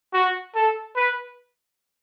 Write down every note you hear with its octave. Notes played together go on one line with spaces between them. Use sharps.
F#4
A4
B4